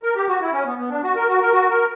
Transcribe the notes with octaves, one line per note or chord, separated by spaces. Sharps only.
A#4
G4
F#4
E4
C#4
B3
B3
D4
F#4
A#4
F#4
A#4
F#4
A#4